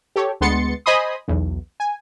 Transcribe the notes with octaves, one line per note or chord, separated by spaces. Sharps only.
G4 A4 C#5
D2 G#3 B3 C6 A6 C#7
C5 D#5 G#5 B5 C6 D#6
B1 E2
G#5